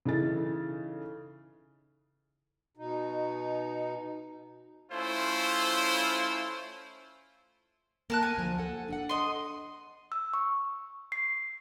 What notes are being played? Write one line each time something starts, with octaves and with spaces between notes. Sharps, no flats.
C#3 E3 D#4 A4 A6
B2 D#4
A3 C#4 E4 F4 C5
A#3 A#4 A5 F#6
G#5
D2 F3
A4 F#5
D4 A4 F#5
D#5 C6
E6
C#6
C7